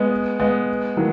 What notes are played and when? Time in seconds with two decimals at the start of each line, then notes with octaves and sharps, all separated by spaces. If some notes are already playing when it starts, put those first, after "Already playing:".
Already playing: G#3 B3
0.40 G#3 B3
0.97 D#3 F#3